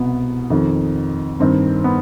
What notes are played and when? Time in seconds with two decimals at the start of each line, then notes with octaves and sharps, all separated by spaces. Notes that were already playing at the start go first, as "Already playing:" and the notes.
Already playing: C2 B2 B3
0.50 F2 D#3
1.40 G2 D#3 C4
1.84 B3